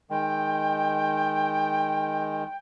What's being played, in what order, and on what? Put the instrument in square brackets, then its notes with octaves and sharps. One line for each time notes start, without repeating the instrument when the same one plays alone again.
[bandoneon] D#3 G#3 [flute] G5